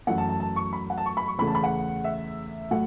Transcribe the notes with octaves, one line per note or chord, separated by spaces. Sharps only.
F#2 E3 A3 F#5
A5
A5
A5
C#6
B5
F#5
A5
C#6
B5
C#6
E2 C#3 A3 B5
A5
B5
F#5
E5
A2 F#3 A3 F#5